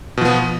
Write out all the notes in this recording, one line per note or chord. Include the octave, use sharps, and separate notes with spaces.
B2 F3 B3